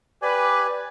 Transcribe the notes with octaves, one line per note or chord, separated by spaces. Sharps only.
G4 B4 D5 G#5